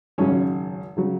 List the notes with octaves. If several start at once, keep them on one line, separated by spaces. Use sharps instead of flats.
G#1 F#2 C#3 F#3 C#4
C#3 F#3